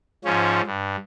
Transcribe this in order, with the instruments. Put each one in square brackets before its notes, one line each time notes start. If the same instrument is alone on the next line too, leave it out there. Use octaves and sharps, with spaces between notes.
[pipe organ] G#2 F3 C#4
G2